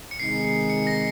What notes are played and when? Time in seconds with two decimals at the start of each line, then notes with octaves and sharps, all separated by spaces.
0.11 C#7
0.19 C3 D#3 G#3 D#4 G#4 C7
0.45 C7
0.70 C#7
0.87 A#6